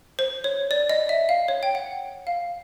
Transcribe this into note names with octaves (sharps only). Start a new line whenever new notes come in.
C5
C#5
D5
D#5
E5
F5
C#5
G5
F#5
F5